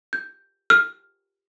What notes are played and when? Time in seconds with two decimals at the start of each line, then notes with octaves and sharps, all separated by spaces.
0.13 G6
0.70 F6